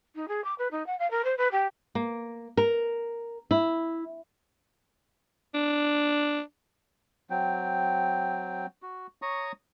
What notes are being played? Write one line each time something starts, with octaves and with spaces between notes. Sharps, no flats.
D#4
G#4
D6
B4
D#4
F#5
F5
A#4
C5
B4
G4
A#3
A#4
E4
D4
F#3 C4 G5
F#4
C#5 A#5 C#6 D#6